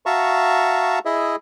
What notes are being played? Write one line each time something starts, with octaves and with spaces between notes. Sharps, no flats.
F#4 E5 F5 A5 A#5 C#6
E4 G#4 D#5 E5